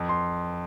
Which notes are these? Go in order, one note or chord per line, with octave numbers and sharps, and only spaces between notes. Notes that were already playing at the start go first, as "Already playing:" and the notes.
Already playing: F2
C6